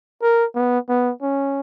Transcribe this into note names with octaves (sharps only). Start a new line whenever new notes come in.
A#4
B3
B3
C#4